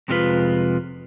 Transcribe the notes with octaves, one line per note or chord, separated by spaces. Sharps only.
F2 C3 G#3 B3 F4 B4